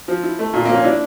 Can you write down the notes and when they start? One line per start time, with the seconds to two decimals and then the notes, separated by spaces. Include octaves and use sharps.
0.08 F3
0.23 E4
0.39 A3
0.53 A#2
0.65 F3 A#3
0.74 C#4
0.84 D4 E4